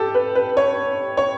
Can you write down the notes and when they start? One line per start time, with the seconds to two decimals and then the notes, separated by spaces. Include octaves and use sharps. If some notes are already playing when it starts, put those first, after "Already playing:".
Already playing: G4 A4
0.14 B4
0.35 B4
0.57 C#5
1.17 C#5